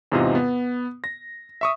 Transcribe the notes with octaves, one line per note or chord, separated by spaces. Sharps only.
E2 G#2 C3 F4 D#5 F5
B3
A#6
E5 C#6 D#6